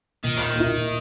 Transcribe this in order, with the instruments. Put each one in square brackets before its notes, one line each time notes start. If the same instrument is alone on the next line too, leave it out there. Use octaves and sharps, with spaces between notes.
[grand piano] A#2 [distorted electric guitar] D#3
[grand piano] A#3 E4